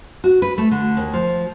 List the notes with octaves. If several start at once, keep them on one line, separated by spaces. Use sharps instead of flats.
F#4
B4
A3
D3
D#2
F3